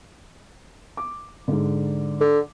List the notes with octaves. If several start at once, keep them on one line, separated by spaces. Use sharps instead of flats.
D6
G#2 D3
D3